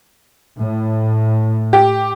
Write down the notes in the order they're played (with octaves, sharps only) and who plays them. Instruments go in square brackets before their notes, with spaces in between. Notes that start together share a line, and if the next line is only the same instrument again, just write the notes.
[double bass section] A2
[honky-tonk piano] G4